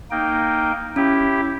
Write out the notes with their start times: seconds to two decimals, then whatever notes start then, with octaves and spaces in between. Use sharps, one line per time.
0.11 A#3 D#4 G5
0.96 C#4 E4 G4